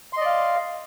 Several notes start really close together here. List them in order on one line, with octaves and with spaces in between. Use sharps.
C6 D#5 D5 F5